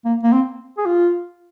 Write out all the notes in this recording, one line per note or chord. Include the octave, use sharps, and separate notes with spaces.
A#3
A#3
C4
G#4
F4